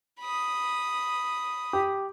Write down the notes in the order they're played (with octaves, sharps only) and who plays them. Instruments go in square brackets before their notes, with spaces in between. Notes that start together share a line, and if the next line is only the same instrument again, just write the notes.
[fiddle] B5 D#6
[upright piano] G4